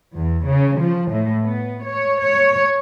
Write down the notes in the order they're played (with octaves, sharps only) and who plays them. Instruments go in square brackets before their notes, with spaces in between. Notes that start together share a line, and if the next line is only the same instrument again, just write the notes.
[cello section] E2
C#3
F3
A2
B3
C#5
C#5